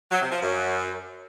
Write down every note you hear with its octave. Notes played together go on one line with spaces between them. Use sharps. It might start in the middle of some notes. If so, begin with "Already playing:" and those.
F#3
C3
F3
F#2